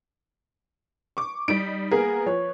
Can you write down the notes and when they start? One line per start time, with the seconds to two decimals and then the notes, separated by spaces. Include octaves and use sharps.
1.17 C#6 D6
1.48 G3 D#4 D7
1.91 A#3 B3 G#4 A#4
2.26 F3 B4 C#5